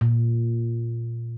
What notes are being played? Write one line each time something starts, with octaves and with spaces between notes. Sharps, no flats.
A#2